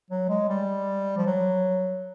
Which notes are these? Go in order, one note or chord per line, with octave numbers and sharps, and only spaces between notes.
F#3
G#3
G3
F3
F#3